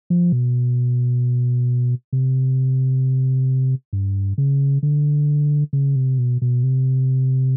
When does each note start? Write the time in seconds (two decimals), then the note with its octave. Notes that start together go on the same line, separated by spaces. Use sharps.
0.10 F3
0.32 B2
2.13 C3
3.93 G2
4.38 C#3
4.83 D3
5.73 C#3
5.96 C3
6.18 B2
6.42 B2
6.63 C3